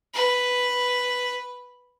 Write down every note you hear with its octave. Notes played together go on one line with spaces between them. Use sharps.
B4